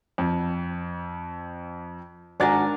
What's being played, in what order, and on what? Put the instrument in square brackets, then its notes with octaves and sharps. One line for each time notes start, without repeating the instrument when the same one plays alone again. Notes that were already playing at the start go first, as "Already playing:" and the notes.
[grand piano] F2
[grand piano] G#1 F#4 A6 [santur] D4 A#4 G#5